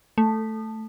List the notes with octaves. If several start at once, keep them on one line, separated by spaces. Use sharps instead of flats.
A3